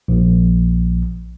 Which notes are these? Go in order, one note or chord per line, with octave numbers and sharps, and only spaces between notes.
A#1